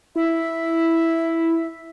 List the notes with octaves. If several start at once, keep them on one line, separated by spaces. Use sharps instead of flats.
E4 E5